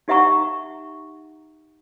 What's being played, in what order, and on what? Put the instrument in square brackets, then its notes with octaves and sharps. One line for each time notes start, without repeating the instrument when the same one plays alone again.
[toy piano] D#4 G4 E5 F#5 A#5 C#6